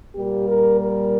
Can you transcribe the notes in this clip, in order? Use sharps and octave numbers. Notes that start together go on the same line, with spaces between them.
A#2 G3 A#3 G4
A#4
A#4